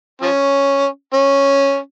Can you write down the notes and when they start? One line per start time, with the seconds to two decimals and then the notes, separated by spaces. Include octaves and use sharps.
0.22 F3 C#4
1.13 C#4